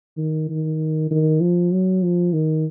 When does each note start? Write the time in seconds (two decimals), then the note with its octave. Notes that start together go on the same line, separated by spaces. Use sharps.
0.17 D#3
0.49 D#3
1.11 D#3
1.41 F3
1.72 F#3
2.03 F3
2.33 D#3